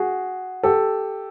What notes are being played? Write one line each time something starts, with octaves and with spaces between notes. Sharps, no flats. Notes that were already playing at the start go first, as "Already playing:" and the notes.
Already playing: F#4 G#4
G4 A4